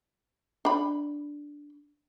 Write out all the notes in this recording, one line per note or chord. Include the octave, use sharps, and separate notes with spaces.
D4 B5